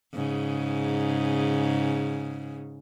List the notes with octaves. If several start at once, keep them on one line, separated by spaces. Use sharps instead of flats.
G#2 C#3